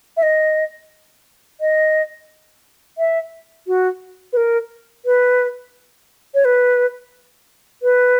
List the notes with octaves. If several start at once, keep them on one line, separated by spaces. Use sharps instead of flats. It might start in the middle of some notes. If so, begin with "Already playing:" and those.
E5
D#5
D#5
E5
F#4
B4
A#4
B4
C#5
B4
B4